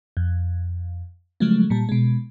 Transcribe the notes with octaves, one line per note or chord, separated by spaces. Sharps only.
F2
C#3 F3 F#3 G#3 A3
A#2 G3 A5
B2 G#3